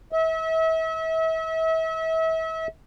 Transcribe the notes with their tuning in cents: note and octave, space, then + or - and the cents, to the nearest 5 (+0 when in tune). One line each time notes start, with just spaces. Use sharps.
E5 -35